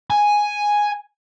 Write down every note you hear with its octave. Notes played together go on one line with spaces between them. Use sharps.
G#5